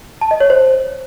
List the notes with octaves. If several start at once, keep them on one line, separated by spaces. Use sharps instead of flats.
A5
D#5
C#5
C5